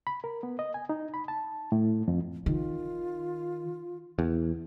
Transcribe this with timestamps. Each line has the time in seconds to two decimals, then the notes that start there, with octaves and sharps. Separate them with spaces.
0.07 B5
0.24 A#4
0.43 B3
0.59 D#5
0.74 G#5
0.89 D#4
1.14 B5
1.28 A5
1.72 A2
2.08 F2
2.46 D#3 F4
4.19 E2